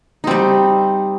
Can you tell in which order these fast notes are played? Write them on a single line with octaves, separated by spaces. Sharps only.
D#4 C4 G3